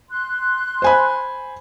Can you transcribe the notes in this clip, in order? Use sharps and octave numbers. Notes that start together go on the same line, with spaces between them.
C6 F#6
C5 G#5 B5